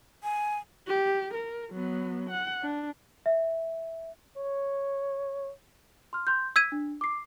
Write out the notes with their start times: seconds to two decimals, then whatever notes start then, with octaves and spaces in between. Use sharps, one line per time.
0.23 G#5
0.87 G4
1.34 A#4
1.71 F#3 B3
2.30 F#5
2.62 D4
3.26 E5
4.37 C#5
6.13 C6 F6
6.27 C6 G6
6.56 E6 G#6 B6 D#7
6.72 D4
7.01 D6 C7